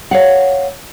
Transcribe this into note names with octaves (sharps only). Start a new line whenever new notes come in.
C#5 F5 F#5